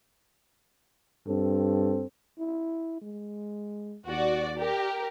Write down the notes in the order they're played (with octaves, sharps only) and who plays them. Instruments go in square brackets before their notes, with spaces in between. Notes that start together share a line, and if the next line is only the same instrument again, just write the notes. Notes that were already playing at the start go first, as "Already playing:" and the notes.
[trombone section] G2 C4 A4
[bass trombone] E4
G#3
[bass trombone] D#2 [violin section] F#4 D5
[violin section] G4 A#4